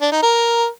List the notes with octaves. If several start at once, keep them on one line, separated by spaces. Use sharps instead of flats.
D4
D#4
A#4